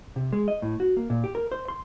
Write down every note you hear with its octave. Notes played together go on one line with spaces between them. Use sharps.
C3
G#3
D#5
A2
F#4
A#3
A#2
G4
A#4
C5
C6